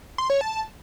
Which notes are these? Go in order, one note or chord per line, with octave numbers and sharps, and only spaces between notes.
C6
C#5
A5